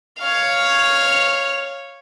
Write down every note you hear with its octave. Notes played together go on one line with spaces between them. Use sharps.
C#5 F5